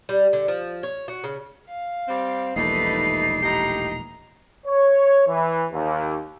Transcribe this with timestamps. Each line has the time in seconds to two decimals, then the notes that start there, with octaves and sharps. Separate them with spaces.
0.09 G3
0.33 D3
0.48 F3
0.83 C#5
1.08 F#4
1.24 C#3
1.67 F5
2.08 G3 C4
2.56 E1 A#1 A#2 G3 A3 D#4 B4 C7
3.43 A2 D#4 G4 A#5
4.66 C#5
5.27 E3
5.72 D#2